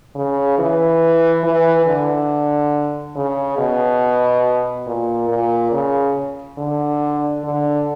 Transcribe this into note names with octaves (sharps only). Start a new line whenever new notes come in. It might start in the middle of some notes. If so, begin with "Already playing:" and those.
C#3
E3
E3
D3
C#3
B2
A#2
A#2
C#3
D3
D3